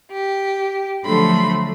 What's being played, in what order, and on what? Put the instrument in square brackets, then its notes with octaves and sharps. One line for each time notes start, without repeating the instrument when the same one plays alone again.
[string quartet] G4
D3 F3 F#3 A3 B5 C6